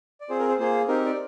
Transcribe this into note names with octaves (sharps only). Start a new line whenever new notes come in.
D5
C4 F4 G#4 C5
A#4
C5
A#3 F4 G#4 C5
C4 D#4 G4 A#4
D5